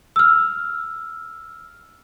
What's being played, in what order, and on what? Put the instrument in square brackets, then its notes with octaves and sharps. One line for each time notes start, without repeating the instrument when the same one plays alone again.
[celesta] E6 F6